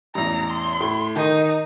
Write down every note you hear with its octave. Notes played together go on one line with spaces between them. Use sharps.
A1 E2 A#5
C6
A2
D#3 D#4